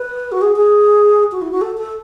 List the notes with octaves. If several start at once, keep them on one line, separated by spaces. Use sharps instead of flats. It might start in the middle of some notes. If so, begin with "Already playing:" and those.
Already playing: B4
F#4
G#4
G#4
F#4
E4
F#4
A4
A4